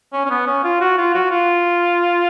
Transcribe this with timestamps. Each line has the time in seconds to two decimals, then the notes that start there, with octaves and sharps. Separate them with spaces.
0.13 C#4
0.25 C#4
0.30 B3
0.46 C#4
0.64 F4
0.81 F#4
0.98 F4
1.14 F#4
1.31 F4